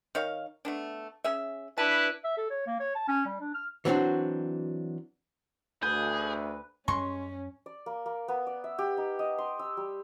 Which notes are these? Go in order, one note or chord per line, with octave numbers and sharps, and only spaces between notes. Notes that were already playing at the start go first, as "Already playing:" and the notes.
D#3 C#5 F5
A3 B3 D4
C#4 G#4 E5
D4 E4 B4 A5
E5
A4
C#5
A#3
C#5
A5
C#4
G3
D4
F6
E3 F#3 B3 C4 D4 F#4
D2 G#4 B4 G6
F#2 G3 G#3 C#4 C6 C#6
D5
A#3
A#3
B3
D5
E5
G4
D#4
D#5
C6
E6
G3